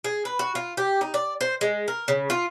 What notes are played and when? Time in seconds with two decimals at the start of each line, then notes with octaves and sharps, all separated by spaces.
0.04 G#4
0.25 B4
0.39 F#4
0.55 F4
0.77 G4
1.01 D#4
1.14 D5
1.41 C5
1.61 G#3
1.88 A#4
2.08 C#3
2.30 F4